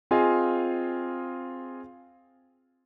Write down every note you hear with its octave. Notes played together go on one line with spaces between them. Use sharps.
C4 F4 G#4 D#5 F5 G#5